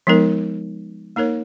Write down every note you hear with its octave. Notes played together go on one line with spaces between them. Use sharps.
F3 G#3 B3 D#4 A#4
A#3 D#4 A#4 C#5